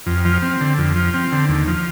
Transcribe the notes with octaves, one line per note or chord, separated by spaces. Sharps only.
F2
F3
C4
D3
F2
F3
C4
D3
D#2
F3